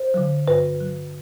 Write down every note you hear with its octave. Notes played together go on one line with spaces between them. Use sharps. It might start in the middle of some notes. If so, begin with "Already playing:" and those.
Already playing: C5
D3 F#3
G2 B4
F#3